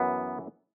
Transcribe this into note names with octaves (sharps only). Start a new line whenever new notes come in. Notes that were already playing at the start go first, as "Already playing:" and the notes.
Already playing: F#2 E3 B3